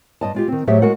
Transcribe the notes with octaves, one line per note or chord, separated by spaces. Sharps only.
G2 D#5 A5
G#3 F4 G4
D#3 C4
A2 F#3 G4 G#4 C5 E5
G#3 F#4 A#4 F#5